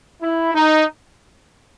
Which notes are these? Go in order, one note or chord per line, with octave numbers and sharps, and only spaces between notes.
E4
D#4